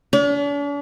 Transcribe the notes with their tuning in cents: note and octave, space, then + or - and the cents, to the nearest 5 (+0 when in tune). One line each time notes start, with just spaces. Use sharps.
D4 -45